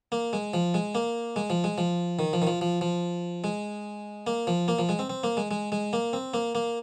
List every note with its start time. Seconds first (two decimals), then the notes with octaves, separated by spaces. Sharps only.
0.12 A#3
0.33 G#3
0.54 F3
0.74 G#3
0.95 A#3
1.36 G#3
1.50 F3
1.64 G#3
1.78 F3
2.19 D#3
2.33 F3
2.42 D#3
2.47 F3
2.61 F3
2.81 F3
3.44 G#3
4.27 A#3
4.47 F3
4.68 A#3
4.79 F3
4.89 G#3
4.99 C4
5.10 C4
5.23 A#3
5.37 G#3
5.51 G#3
5.72 G#3
5.93 A#3
6.13 C4
6.34 A#3
6.55 A#3